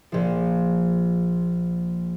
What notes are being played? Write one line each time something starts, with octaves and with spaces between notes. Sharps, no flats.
A#1 F3